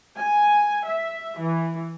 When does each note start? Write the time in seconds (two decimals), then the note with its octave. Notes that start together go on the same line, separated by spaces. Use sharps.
0.16 G#5
0.84 E5
1.38 E3